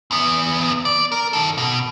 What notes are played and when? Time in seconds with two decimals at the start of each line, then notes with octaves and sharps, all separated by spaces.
0.11 E2 B3
0.85 D5
1.12 A#4
1.33 D#3 A4
1.58 B2